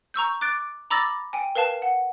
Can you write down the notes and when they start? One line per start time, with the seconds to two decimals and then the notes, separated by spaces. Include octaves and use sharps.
0.14 A#5 C#6 E6 G6
0.41 D6 F#6 A6 D7
0.90 A#5 B5 D6 E6 A6 A#6
1.33 G5 G#5
1.55 A#4 B4 F5 A5
1.82 F#5